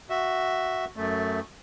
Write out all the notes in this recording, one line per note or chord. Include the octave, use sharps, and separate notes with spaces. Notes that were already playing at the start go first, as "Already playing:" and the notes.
F#4 E5
F#2 A3